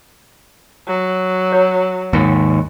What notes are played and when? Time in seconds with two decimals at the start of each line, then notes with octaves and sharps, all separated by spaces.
0.88 F#3
1.52 C#5
2.13 D#2 G#2